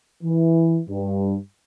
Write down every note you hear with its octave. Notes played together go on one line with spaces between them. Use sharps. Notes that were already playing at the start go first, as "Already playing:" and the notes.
E3
G2